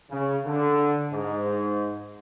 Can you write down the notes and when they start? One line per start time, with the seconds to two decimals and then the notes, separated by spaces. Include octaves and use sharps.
0.10 C#3
0.46 D3
1.12 G#2